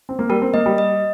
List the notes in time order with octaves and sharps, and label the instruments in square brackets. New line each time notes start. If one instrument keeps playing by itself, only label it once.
[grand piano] C4
A#3
[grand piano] G3 [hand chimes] A#4
[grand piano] C4
[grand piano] A#3 [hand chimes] D#5
[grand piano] G3
[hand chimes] D#5